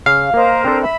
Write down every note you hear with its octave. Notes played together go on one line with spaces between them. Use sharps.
C#3 F5
A#3 A#4 C5 D#5 A#5
C4 D4 A4
E5 B5